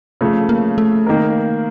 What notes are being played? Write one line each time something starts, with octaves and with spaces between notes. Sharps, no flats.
C#3 F3 A3
A#3
A3
D#3 A#3 D#4 A#4